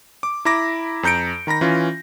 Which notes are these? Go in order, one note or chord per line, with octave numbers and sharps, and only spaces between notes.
D6
E4 A#5 B5 D6 A#6
F2 A#5 G6 C#7 D7
D#3 A#5 B5 A#6
E3 C#4 F4